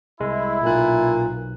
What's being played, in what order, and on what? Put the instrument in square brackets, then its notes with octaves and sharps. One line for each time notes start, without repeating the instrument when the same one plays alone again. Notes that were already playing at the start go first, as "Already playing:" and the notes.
[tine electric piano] C2 G#3 [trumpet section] E4
[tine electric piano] B1 F#6 [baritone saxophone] A#2